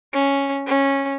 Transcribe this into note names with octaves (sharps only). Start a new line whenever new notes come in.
C#4
C#4